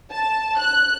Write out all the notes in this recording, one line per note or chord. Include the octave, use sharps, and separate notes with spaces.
A5
F#6